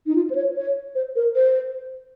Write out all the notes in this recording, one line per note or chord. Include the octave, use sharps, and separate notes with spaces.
D#4
F4
C5
C#5
C#5
C5
A#4
C5